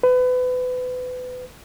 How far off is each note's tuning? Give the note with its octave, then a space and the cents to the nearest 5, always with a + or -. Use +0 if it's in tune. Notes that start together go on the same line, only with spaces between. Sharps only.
B4 +30